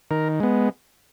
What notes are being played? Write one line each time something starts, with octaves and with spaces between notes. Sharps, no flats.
D#3 A#4
G#3 B3